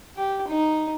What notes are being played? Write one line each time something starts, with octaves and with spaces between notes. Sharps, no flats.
G4
D#4